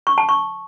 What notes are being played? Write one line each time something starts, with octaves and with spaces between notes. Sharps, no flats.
C#6
A5
C#6